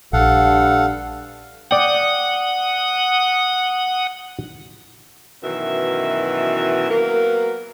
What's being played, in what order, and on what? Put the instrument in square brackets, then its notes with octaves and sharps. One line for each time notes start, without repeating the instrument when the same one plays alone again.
[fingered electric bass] A#1 [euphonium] G2 [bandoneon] A4 F5 F#5
[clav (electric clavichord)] D5 G5 [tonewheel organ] F#5 D#6
[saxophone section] F#2 B2 D#3 E3 E5
F#3 A#3 B3 A#4